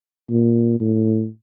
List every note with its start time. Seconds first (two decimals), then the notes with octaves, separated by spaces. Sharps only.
0.30 A#2
0.80 A2